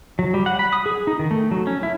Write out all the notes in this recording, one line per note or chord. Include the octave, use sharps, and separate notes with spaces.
F#3
G3
F#5
B5
D#6
G#4
D#4
D#3
A3
F#3
C#4
E4